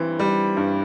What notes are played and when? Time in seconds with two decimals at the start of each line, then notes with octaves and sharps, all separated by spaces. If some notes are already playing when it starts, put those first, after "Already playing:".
Already playing: G2 E3 C4
0.19 G3
0.57 G2